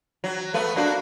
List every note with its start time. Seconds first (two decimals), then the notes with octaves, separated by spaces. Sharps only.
0.24 F#3
0.54 A3 B3
0.76 A#3 D4 F#4